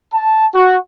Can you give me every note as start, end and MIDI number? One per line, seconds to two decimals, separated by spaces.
0.14 0.44 81
0.55 0.76 66